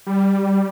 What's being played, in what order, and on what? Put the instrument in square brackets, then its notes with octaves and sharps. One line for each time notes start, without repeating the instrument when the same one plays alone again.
[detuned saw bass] G3